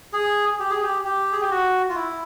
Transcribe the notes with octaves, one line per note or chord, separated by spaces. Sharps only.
G#4
G4
G#4
G4
G4
G#4
G4
F#4
F4
E4